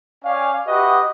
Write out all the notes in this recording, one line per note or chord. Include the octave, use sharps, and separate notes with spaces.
C#4 D5 F5 G5 G#5
F#4 G4 B4 D#5 E5 F#5